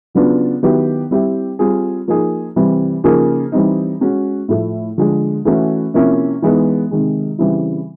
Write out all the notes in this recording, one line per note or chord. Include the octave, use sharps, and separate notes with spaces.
C#3 F#3 B3 D4 F4
D#3 F#3 B3 E4 G4
G3 C4 E4 G4
G3 C4 F4 G#4
F3 A#3 D#4 G#4
C3 E3 G3 C4
C#3 F3 A#3 D#4 G#4
E3 G3 C4 D#4
G#3 C#4 F#4
A2 F3 A3
D3 F3 G#3
E3 A3 C#4 F#4
C3 F3 A#3 C#4 E4
E3 G#3 B3 D#4
C3 D#3 G#3
C#3 E3 G3 C4 E4